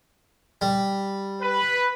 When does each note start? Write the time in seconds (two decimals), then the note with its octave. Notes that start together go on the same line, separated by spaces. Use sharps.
0.61 G3
1.42 B4